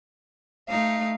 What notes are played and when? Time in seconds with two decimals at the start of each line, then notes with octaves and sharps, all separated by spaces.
0.70 A3 D#4 F5